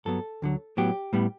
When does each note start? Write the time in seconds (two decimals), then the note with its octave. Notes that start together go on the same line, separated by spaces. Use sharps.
0.05 G2 F#3 B3 A4
0.42 D2 D3 F#3
0.77 A2 F#3 B3 G4
1.13 A2 G3 B3